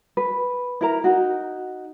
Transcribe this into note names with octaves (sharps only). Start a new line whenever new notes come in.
B4
E4 A#4 A#5
D#4 F#4